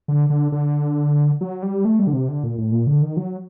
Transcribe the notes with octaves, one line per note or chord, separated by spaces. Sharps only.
D3
D3
D3
F#3
G3
A3
G3
D3
C3
D3
A#2
A2
A#2
D3
D#3
F#3